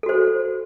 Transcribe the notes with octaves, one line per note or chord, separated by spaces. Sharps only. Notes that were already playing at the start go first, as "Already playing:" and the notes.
F#4 A4 C5